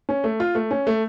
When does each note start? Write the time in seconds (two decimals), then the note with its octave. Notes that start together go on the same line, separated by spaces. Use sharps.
0.09 C#4
0.24 A3
0.40 F4
0.55 A3
0.71 C#4
0.87 A3